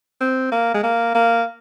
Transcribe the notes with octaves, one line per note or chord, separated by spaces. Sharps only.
C4
A#3
G#3
A#3
A#3